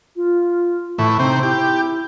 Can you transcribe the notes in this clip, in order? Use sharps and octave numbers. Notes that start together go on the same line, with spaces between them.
F4
A2 E3 C#6
C3 C4 D#4
E4 G4